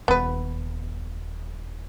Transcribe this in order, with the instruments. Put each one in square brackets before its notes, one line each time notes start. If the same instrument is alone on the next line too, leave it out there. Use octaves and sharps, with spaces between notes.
[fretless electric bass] D#1 [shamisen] B3 B4